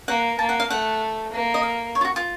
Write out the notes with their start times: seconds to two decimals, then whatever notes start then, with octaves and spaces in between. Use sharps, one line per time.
0.08 A#3 F#5
0.39 A#3 A5
0.49 F#5
0.60 F5
0.70 A3 F#5
1.33 A#3
1.54 D#5
1.63 F5
1.95 C#5
2.01 F4
2.05 F#4
2.16 F4